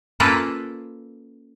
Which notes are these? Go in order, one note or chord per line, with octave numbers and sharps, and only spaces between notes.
A#3 C#4 F4 A4 B4